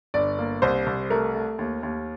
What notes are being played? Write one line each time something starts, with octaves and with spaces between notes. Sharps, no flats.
G1 D5
A#3
C2 C5
C2
A3 A#4
A3
D#2
D#2